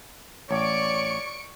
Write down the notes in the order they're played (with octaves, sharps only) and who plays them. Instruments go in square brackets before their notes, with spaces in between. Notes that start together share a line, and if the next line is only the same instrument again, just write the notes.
[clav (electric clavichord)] A1 [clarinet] C#5 [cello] D5 [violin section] C#6 C#7 D7